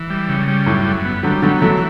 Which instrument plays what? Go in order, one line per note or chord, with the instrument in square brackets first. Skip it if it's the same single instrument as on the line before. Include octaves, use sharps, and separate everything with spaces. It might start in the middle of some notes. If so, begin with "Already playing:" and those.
Already playing: [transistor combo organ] E3
G3
C#3
G3
[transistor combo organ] F#2 [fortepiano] A2
[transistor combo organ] F#2
B3
[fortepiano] D3 F#3 [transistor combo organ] G3
[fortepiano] D3 F#3 [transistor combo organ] B3
[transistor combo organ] E3 [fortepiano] F#3 A3